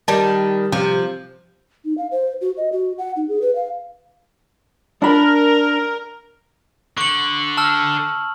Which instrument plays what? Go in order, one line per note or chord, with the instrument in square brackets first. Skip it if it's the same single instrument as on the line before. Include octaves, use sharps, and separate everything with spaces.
[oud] D#3 G3 [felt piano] A5
[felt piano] C3 [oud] F3
[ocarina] D#4
F5
C5
F#4
D#5
F#4
F#5
D#4
G#4
B4
F5
[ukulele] D4 B5 [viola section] A#4
[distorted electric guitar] D3 [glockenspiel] C#6 F#7
[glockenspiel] A5 E6 F6